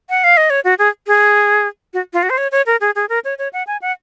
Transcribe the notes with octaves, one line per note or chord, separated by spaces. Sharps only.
F#5
F5
D#5
C#5
F#4
G#4
G#4
F#4
F4
F#4
C5
C#5
C#5
A#4
G#4
G#4
A#4
C#5
C#5
F#5
G#5
F#5